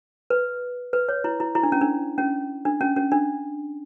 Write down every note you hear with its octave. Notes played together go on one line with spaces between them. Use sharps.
B4
B4
C#5
E4
E4
E4
D4
C#4
D4
C#4
D4
C#4
C#4
D4